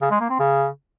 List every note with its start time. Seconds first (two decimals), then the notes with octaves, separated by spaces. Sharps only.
0.02 C#3
0.11 G#3
0.20 A#3
0.30 C4
0.39 C#3